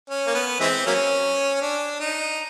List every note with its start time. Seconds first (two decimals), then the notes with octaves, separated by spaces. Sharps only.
0.10 C#4
0.27 A#3
0.35 B3
0.60 E3 G#3 C4
0.86 F#3 A#3 C#4
1.62 D4
2.00 D#4